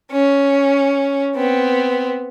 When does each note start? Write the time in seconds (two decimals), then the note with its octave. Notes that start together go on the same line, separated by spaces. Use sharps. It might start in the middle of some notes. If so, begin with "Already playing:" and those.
0.12 C#4
1.35 B3 C4